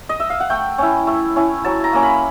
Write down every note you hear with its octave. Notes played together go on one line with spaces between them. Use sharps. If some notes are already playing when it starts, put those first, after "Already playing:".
D#5
E5
F5
F#5
A3 G5
C#4 E4
A3
C#4 E4
F#3 A5
A#5
A#3 C#4
B5